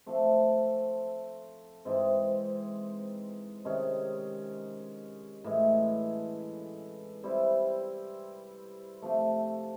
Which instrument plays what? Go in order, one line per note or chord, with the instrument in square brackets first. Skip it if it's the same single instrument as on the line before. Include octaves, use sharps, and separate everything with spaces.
[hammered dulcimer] F3 A3 C4
G#2 E3 G#3 C4
C3 D#3 G#3 C#4
A2 E3 G#3
G3 C4 E4
C3 F3 A3